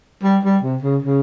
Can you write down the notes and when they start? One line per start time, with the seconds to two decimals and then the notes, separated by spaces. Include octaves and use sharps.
0.23 G3
0.43 G3
0.63 C3
0.83 C#3
1.02 C#3